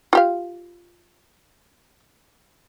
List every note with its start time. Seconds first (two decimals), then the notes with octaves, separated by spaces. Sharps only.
0.13 F4 G4 F5